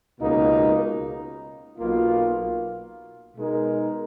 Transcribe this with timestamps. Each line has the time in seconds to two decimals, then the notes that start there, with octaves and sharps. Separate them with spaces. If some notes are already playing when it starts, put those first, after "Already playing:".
0.19 C#2 B2 A#3 D#4
1.78 B1 B2 A#3 F4
3.36 B2 G#3 D#4 A#4